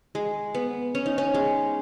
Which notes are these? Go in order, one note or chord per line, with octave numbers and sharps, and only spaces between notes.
G#3
B3
C#4
D#4
C#4
G#3